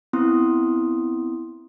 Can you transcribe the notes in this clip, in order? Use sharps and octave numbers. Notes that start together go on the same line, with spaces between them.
B3 C4 E4 C6 D#6